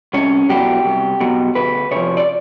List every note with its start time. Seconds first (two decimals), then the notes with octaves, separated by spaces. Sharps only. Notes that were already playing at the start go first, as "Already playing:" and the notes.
0.13 C2 C#4
0.49 B2 F#3 G4
0.84 C2
1.20 B2 F#3
1.55 D2 B4
1.91 C3 F3 C#5
2.17 D5